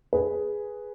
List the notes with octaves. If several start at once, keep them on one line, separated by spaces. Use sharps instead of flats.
G#4 B4